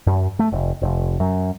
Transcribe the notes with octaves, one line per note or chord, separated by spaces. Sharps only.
F#2
A3
F1
F1
F#2